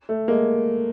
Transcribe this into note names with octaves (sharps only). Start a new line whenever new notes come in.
A3
G#3 A#3